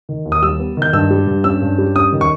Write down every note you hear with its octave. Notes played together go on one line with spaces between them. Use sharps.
D#3
D#2
D#6
G3 E6
B3
D#3 G6
G2 E6
G3
G2
C#4 E6
G2
G3
C#4 D#6
D#3
C#6